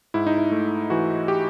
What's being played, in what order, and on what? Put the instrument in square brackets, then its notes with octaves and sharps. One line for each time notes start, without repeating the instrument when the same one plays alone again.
[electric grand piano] G#2 E4
D#4
E4
A3
E3 F#4
G4